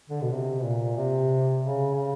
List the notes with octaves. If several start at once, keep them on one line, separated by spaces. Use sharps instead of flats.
D3
B2
C3
A#2
C3
C#3
C#3